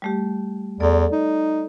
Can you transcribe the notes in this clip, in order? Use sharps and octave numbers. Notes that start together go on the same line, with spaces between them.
G3 A3 G4
E2 A4 D5
D#4